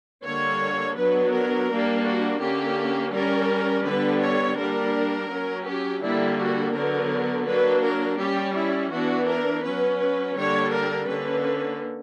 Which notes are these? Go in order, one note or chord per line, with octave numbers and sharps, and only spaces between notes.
D3 G3 A#3 C#5
F#3 B3 D4 B4
A#4
G3 A#3 D4
F#4
D3 A#3 C#4 G4
G3 C#4 A#4
D3 G3 B3 D4 B4
C#5
G3 A#3 D4 A#4
F#3 C#4
G4
D3 G3 A#3 D4 E4
F#4
D3 F#3 B3 A#4
F#3 A#3 D4 B4
A#4
G3 C#4 G4
E4
E3 B3 D4 F#4
A#4
F#3 C#4 B4
B4
D3 G3 A#3 D4 C#5
A#4
D3 A#3 C#4 B4